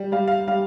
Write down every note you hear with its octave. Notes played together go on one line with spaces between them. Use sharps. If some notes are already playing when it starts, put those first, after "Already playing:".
Already playing: G3
G3 F5
F5
G3 F5